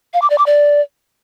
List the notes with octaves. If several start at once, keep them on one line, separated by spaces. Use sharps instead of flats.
F5
D6
D5
D6
D5